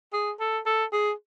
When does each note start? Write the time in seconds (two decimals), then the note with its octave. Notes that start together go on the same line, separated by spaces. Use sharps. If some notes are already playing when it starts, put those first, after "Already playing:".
0.13 G#4
0.40 A4
0.66 A4
0.93 G#4